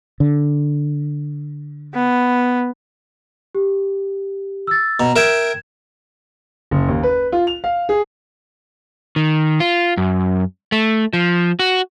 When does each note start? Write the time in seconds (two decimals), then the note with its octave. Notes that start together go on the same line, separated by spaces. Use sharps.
0.20 D3
1.94 B3
3.55 G4
4.67 E6 A6
5.00 B2 A#5
5.16 A#4 E5 G5 G#6 E7
6.71 F#1
6.88 D#2
7.03 B4
7.32 F4
7.47 F7
7.64 F5
7.89 G#4
9.16 D#3
9.60 F4
9.97 F#2
10.72 A3
11.13 F3
11.59 F#4